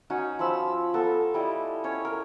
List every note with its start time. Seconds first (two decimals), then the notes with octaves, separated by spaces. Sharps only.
0.10 C#4 D#4 F#4
0.39 F3 A5 B5 E6
0.94 B3 A4 A#5
1.34 G3 E4 D#5
1.84 C#4 C#5
2.05 A#4